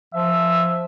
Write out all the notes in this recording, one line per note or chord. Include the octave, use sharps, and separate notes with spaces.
F3 E5